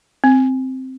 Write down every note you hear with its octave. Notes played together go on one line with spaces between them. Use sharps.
C4